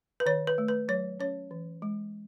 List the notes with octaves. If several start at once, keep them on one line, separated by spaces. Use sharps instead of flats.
B4
D#3 C#5
B4
A3
B4
F#3 C#5
C#4 C#5
E3
G#3